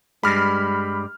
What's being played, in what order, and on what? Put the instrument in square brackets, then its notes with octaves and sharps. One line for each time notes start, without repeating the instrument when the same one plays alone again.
[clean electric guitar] G2 G3 G#3 [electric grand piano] B5 F6